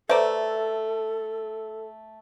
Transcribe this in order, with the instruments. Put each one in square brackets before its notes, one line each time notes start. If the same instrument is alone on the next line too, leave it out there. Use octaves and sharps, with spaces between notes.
[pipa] A3 D5 [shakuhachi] A4 [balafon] B4 C5 [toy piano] E5 A#5